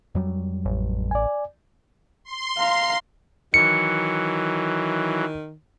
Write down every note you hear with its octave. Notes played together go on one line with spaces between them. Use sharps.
F2 F#3 G3
A1
D5 G#5
C6
F5 A#5
D#3 E3 F#3 C#7